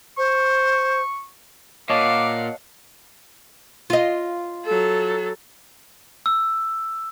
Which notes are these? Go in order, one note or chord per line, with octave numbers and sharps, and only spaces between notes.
C5 C#6
A#2 C#5 D#5 F5 F#5 A5 D6
F4 D#5
F#3 A4
E6